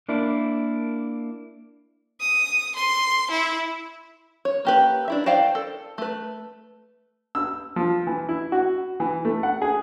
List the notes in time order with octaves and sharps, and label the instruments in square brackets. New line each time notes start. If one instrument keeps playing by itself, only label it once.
[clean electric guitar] A#3 D4 E4
[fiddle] D#6
C6
E4
[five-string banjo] C#5
A#3 G4 B4
D4 E4 E5
C5 D5 F5 G5 A5
A4
A3 B4
[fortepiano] E6
F3
E3
E4
F#4
E3
A3
F#5
G#4